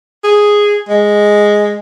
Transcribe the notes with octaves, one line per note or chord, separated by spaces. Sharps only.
G#4
G#3